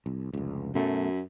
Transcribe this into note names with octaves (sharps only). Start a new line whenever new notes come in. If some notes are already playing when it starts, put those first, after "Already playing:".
C2
F1 C#2
F#2 B2 F#3 A3